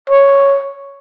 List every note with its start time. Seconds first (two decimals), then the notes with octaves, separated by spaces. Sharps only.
0.10 C#5